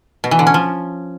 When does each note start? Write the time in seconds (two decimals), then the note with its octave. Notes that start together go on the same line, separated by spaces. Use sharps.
0.24 B2
0.31 E3
0.39 D3
0.47 C#4
0.54 F3